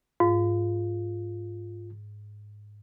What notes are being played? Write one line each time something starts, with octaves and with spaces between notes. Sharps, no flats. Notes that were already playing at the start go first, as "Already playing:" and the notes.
G#2 F4